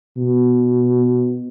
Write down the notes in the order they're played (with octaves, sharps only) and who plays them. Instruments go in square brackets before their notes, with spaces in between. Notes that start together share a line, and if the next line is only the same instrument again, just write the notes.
[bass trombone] B2